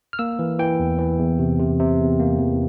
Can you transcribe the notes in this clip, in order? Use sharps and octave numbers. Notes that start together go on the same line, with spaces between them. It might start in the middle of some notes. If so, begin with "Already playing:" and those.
F6
A#3 E6
E3
E3 G5
E2
E3
E2
C3
C3
C3
E2
A#3
E2